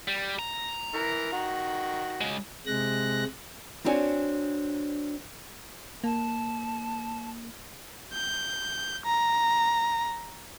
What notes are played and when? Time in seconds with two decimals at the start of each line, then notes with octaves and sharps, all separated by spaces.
0.08 G3
0.39 A#5
0.94 E3 A#4
1.32 D#3 F#4
2.21 C#3 G#3
2.66 C3 G#3 F#6 A#6
3.84 C4 D4 E4 F#4 C#5 G#5
6.04 A#3 A5
8.14 G6
9.06 A#5